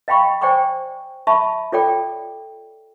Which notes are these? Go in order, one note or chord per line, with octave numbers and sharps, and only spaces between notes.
D#5 F5 G5 B5 C#6
C5 D5 G5 G#5 C#6 D6
E5 A5 B5 C#6
F4 A4 C#5 D5 G5 D6